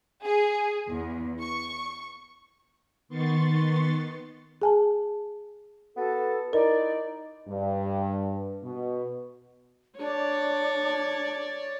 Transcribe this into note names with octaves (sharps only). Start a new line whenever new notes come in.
G#4
E2
C#6
D#3 B3 C6 C#6 A6
G#4 G#5 A5
B3 F#4 A4
D#4 E4 A#4 D5
G2
B2
D4 C#5 D5